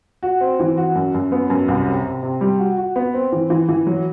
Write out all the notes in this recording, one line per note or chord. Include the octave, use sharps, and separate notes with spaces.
F#4
C4
E3
F#4
F#2
F#2
B3
F#2
C2
C3
C3
C3
G3
F#4
F#4
B3
C4
E3
E3
E3
F#3